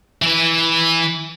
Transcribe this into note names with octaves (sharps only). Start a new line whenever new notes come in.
E3 B4